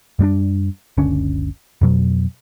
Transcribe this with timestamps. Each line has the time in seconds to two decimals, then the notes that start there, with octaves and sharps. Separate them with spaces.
0.19 F#2 G3 B3 D4
0.97 F#1 C#2 D3 C#4
1.81 F2 B2 F#3